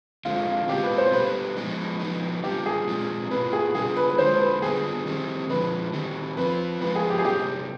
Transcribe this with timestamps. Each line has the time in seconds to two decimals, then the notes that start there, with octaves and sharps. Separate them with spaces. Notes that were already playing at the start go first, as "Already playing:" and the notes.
0.25 D3 G#3 C4 F4
0.47 F4
0.68 B2 G#3 C4 F4 G4
0.83 B4
0.98 C5
1.12 B2 G3 B3 B4
1.56 F3 G#3 B3 D#4
1.99 F3 B3 D#4
2.44 G3 D4 F4 G4
2.66 G#4
2.87 B2 G#3 C4 F4
3.31 B2 B3 F4 B4
3.53 G#4
3.74 G3 D4 F4 G#4
3.97 B4
4.10 B4
4.18 D3 G#3 D4 F4 C5
4.40 B4
4.62 G3 B3 D4 F4 G#4
5.06 D#3 G3 C4
5.49 D3 F3 G#3 B4
5.93 D#3 G3 C4
6.37 F3 C4 F4 B4
6.81 F3 G#3 B3 F4 B4
6.95 G#4
7.10 G4
7.19 G#4
7.24 C3 G3 B3 D#4 G4